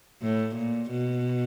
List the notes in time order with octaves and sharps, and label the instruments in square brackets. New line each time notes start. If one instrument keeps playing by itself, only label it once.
[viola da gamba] A2
A#2
B2